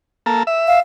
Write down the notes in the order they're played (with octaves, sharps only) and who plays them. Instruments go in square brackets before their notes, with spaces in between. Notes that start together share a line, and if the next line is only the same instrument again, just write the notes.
[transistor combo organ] A#3 A4
E5
[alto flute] F5